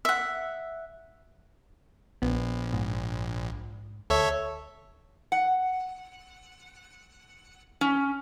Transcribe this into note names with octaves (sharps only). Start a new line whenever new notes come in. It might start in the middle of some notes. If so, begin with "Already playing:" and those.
E5 F#5
A#1 B3
G#2
D2 A4 C#5 E5
F#5
C#4